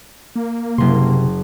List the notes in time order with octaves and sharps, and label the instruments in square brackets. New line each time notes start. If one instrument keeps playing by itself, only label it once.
[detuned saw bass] A#3
[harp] F#1 C6 [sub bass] C3